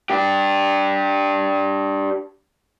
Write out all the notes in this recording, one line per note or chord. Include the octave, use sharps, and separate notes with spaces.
D4 G4